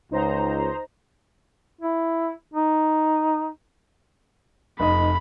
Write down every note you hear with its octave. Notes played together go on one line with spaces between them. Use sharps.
C#2 D#4 C5 A#5
E4
D#4
F1 D#4 D#5 B5